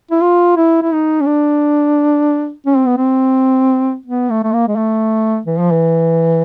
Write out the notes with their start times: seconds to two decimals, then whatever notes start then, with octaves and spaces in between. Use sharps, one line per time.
0.11 E4
0.21 F4
0.57 E4
0.83 E4
0.92 D#4
1.21 C#4
1.26 D4
2.67 C#4
2.77 C4
2.87 B3
2.98 C4
4.06 B3
4.30 A3
4.44 A3
4.53 A#3
4.68 G#3
4.76 A3
5.46 E3
5.59 F3
5.72 E3